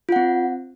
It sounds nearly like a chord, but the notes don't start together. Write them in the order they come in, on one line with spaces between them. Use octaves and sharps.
F4 F#5 C4